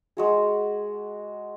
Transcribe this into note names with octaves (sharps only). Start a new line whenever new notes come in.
G#3 F#4 G#4